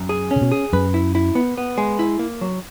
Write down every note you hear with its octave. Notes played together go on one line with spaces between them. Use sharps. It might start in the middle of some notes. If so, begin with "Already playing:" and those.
Already playing: F#2
G#4
C#4
C#3
B2
G#4
F#2 B4
E4
E4
B3
B3
G#3
E4
A#3
F#3